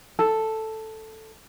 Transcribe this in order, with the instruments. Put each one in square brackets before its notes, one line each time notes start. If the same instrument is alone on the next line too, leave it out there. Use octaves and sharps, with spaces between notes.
[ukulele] A4